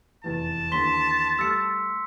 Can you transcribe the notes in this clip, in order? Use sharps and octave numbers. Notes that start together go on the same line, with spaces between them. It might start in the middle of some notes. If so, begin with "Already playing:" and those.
F1 E2 E3 A5
D#2 D3 E3 C6 B6 G7
G3 A3 E6 F6 C#7